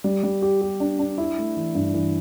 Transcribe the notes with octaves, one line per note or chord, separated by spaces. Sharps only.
G3
G3
G4
G4
D4
D4
E4
A3
E3
G2
E3